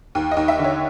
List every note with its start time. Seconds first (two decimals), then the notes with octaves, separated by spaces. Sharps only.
0.15 D#2
0.31 D#5
0.37 D#2
0.48 E5
0.59 D3
0.64 C#5